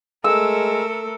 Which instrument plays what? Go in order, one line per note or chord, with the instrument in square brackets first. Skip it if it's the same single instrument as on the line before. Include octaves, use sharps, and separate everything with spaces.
[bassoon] G#3 [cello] A3 A4 [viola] A#4 [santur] E6